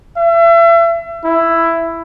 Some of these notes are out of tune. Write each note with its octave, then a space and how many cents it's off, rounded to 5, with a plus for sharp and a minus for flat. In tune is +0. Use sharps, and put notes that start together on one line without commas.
E5 +35
E4 +10